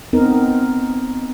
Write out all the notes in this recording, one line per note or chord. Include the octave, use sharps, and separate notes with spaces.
B3 C4 D#4 A#4